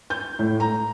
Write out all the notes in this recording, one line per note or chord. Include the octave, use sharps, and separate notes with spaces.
G6
A2
A#5